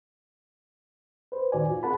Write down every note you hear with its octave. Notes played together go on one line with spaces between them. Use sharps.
B4 C5
A2 D#3 F#4 D5 G#5
F4
C4 G#4 A#4 F#5 A5 B5